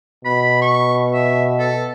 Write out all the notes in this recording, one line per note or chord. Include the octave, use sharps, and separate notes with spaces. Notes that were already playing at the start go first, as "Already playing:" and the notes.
B2 B5
C#6
E5
A4